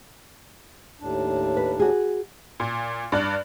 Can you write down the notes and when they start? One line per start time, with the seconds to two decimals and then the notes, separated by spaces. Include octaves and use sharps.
1.01 D#2 A2 D4
1.57 B4
1.80 F#4 G#4
2.60 A#2
3.12 G2 D5 F#6